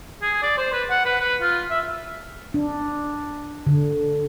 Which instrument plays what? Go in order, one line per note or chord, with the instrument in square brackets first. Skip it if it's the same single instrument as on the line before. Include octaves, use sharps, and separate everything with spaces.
[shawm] G#4
D5
C5
B4
F#5
B4
B4
F4
E5
[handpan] D4
D3